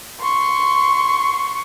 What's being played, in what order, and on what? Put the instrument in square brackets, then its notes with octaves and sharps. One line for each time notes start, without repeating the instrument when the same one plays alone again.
[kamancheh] C6 C#6